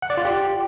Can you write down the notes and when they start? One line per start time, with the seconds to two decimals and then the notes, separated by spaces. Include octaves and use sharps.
0.02 F#5
0.10 D5
0.17 F4
0.25 G4